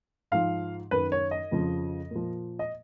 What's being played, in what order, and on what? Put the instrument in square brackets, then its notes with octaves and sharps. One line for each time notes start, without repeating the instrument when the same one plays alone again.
[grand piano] G#2 F3 F5
F#2 D#3 B4
C#5
D#5
F2 C#3 F3
A#2 F3
D#5